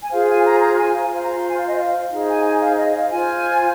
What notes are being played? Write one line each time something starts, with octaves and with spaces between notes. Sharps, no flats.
G#5
F4 G#4 C5 F5
G#5
A#5
A#5
G#5
F5
F4 C5 F5
A#5
C6
G#5
F5
D#5
F5
D#4 G#4 C5 F5
G#5
G#5
F5
D#5
F5
F4 C5 G#5